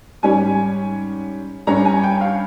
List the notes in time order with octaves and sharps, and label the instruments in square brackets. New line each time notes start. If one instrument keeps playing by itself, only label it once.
[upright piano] G#2 G3 C#4 G#5
G2 G3 C#4 A#5
G#5
G5
F5